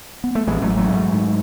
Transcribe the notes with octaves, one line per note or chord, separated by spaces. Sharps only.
B3
A3
A1 E3 G#3
F#3 A3
A1
F#3 A3
G#2
G#2